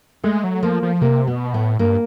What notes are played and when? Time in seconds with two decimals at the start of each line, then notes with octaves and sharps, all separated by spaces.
0.24 G#3 A3
0.44 F#3
0.63 F3 A#3
0.83 F3
1.02 C3 A#3
1.27 B2 B3
1.54 A2 B3
1.79 G2 A#3